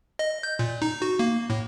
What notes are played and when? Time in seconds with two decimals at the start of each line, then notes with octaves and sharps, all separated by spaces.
0.19 D#5
0.43 G6
0.59 A#2
0.82 D#4
1.02 F#4
1.19 A#3
1.50 A2